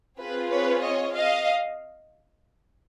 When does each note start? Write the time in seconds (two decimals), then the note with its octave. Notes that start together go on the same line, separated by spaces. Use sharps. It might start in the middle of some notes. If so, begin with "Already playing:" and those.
0.19 C4 F4 G#4 B4
0.51 B4 C#5
0.84 C#5 D#5
1.15 D#5 F5